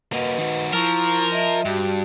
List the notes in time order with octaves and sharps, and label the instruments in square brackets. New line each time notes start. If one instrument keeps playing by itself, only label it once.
[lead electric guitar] A#3 F#4 [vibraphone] B4 D#5
[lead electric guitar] D#3 F#4
[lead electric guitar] F3 [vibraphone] E4 C#6 [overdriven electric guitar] A#4
[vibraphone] D#5 E5
[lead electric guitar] G2 [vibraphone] F#4 G4